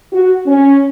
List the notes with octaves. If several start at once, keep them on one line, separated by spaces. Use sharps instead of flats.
F#4
C#4